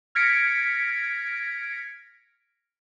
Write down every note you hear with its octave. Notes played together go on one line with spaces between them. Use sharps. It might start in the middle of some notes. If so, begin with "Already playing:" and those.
F6 G#6 A#6 B6 C#7 D7